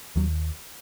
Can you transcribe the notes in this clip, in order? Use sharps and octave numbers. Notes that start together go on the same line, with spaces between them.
D#2 F#3